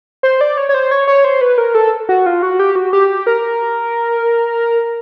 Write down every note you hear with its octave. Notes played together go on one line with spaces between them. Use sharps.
C5
D5
C#5
C#5
C5
C#5
C#5
C5
B4
A#4
A4
F#4
F4
F#4
G4
F#4
G4
A#4